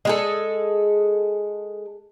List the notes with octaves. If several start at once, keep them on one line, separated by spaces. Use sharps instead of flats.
G#3 G#4 A4